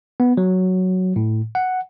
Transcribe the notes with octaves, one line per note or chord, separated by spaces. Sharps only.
B3
F#3
A2
F#5